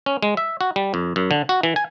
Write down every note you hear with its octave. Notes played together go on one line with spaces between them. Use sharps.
C#4
G#3
E5
F#4
G3
F2
F#2
D3
F#4
E3
G#5